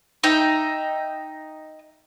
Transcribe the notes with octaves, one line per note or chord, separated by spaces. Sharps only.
D#4 E5 G5